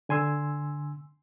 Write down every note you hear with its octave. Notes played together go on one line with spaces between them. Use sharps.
D3 G#5 C6 E6